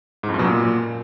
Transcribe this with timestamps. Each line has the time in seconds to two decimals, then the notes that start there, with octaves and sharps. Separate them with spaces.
0.23 G#2
0.29 F2
0.34 F#2
0.39 B2
0.44 A#2